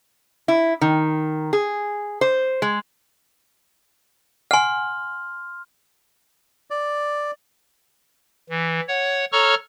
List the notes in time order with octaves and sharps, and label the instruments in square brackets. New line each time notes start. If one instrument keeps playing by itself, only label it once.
[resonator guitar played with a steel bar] E4
D#3
G#4
C5
G#3
[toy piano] F#5 G#5 [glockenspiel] C6 F6
[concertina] D5
[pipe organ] E3
C#5 F#5
A4 C#5 A#5 C#6 F6